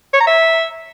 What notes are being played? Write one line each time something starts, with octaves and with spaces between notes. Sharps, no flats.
C#5
A#5
E5